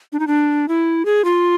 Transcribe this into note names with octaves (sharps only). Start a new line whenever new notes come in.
D4
D#4
D4
E4
G#4
F4